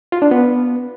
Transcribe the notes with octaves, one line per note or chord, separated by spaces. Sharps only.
F4
D4
B3